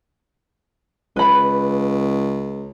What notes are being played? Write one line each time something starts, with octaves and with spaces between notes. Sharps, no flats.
C#2 B4 B5